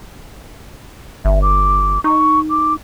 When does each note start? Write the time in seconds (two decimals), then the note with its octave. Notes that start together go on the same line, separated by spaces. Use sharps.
1.25 G1 E5
1.42 D6
2.04 D#4 C#6
2.50 D6